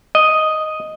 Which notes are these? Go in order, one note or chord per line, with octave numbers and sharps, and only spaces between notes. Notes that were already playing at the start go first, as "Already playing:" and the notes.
D#5